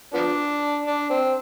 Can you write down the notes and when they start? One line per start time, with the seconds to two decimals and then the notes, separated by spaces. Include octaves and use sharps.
0.14 F3 B3 D4
0.87 D4
1.10 C4